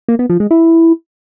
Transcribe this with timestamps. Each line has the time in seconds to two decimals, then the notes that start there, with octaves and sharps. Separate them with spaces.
0.08 A#3
0.19 B3
0.30 F3
0.40 G#3
0.51 E4